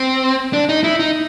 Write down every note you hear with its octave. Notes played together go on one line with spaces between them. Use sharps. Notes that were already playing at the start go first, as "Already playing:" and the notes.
Already playing: C4
D4
D#4
E4
D#4